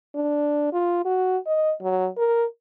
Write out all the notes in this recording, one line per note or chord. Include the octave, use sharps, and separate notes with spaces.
D4
F4
F#4
D#5
F#3
A#4